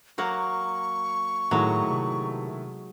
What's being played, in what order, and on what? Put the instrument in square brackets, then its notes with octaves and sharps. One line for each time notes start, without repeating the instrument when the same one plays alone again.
[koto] F#3 A#3 F#5 [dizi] C#6
[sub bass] A2 [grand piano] D#3 A3 E4 [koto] F#3 G#3
[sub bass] C3